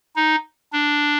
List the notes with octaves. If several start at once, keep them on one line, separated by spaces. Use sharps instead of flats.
D#4
D4